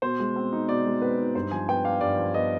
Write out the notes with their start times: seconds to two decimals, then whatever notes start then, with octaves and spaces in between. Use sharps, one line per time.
0.02 B2 C5
0.20 G#3
0.36 C4
0.52 D#4
0.68 B2 D5
0.86 G#3
1.02 C4 B4
1.18 D#4
1.35 G2 C5
1.52 F3 G#5
1.69 B3 G5
1.84 D4 F5
2.01 G2 D5
2.18 F3
2.34 B3 D#5